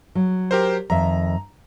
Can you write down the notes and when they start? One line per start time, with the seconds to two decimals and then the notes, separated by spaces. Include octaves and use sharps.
0.15 F#3
0.51 G4 A#4 C5
0.90 F2 D#3 E5 A#5